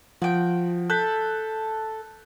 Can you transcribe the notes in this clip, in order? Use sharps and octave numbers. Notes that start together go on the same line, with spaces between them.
F3 F#4 G5
A4 F#6 G6 B6